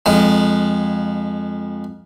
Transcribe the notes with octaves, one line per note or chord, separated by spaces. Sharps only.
F2 G#3